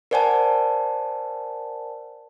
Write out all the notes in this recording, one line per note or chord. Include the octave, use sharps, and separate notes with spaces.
A#4 C5 D5 F#5 G#5 A5